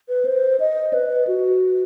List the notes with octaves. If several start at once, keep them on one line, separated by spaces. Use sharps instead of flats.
B4
C5
D#5
B4
F#4